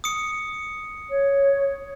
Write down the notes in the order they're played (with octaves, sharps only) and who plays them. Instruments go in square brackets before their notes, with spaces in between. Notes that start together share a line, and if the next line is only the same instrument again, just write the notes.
[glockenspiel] D#6 C#7
[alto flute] C#5